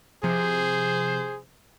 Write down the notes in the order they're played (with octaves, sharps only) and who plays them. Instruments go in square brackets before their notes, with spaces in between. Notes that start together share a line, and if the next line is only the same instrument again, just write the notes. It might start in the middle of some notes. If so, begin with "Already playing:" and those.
[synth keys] C3 F3 [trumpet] G#4 [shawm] C5